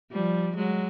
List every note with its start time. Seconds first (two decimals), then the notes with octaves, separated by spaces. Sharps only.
0.12 F3 G3
0.56 F#3 G#3